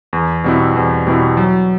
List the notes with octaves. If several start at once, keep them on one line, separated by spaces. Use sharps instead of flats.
E2
B2 G3 C4 E4
E2
B2 G3 C4 E4
F#3